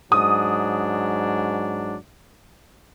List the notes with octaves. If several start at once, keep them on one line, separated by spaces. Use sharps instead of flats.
G#2 F#3 D4 D#6